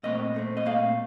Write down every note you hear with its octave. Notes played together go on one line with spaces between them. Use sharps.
A#2 A3 C4 D#5
A#2 A3 C4
D#5
A#2 A3 C4 F5